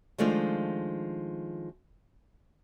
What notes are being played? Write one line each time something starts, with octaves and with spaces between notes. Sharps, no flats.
D#3 F3 G#3 A3 D4 F4